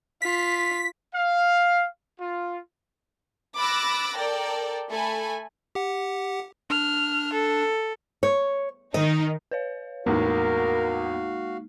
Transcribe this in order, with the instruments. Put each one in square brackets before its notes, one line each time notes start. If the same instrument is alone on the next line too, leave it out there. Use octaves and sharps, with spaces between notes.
[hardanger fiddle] F4 [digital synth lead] B6
[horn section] F5
F4
[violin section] B5 D6 E6 F#6 A6 A#6
A4 A#4 D5 G5
A3 A4 G#5 B5
[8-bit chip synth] G4 F#5
[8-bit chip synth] D4 [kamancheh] F6
[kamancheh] A4
[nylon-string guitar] C#5
[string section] D#3 D#4 [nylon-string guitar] D#5
[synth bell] B4 C#5 F5
[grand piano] E2 A2 [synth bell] G#3 A#3 D#4 [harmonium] F#4 F5 [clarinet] A#4